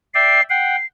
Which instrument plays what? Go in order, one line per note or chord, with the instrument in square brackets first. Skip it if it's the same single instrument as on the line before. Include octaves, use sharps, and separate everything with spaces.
[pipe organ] D5 E5 G5 [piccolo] C7
[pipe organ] F#5 G5 [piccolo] C7